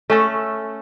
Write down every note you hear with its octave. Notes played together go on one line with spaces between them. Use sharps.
A3 C#4 A4